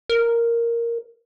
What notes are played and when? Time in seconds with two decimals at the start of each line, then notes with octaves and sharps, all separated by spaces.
0.09 A#4